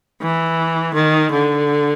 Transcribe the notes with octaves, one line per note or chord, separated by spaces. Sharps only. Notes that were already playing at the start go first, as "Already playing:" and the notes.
E3
D#3
D3